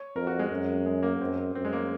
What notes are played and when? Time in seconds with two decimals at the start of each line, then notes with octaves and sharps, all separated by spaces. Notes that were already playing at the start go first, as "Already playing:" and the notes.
Already playing: C#5
0.15 F2 A#4
0.27 F#4
0.39 G#3
0.51 F#2
0.86 G#3
1.03 A#3
1.21 F#2 C4
1.55 F#2 C4
1.65 G#3
1.73 A#3